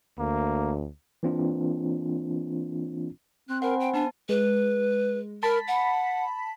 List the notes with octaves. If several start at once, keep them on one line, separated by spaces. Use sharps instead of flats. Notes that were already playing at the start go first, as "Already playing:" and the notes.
D2 A#3
E3 A#3 C4 D4 F4
C4 F#6
A#4 C5 F#5 G#5 B5
G5
B3 D4 A5
G#3 B4
A#4 A5 B5 B6
F#5